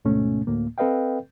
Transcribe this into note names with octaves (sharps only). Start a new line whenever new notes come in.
D2 G#2 B2 A3 C#4
D2 A2 A#3
C4 A4 B4 D#5 F5 G5